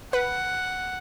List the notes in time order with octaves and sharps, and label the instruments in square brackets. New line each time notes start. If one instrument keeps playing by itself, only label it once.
[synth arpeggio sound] B4 [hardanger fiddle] F#5